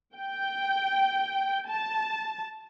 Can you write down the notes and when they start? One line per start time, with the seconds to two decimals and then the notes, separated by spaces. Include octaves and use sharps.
0.17 G5
1.69 A5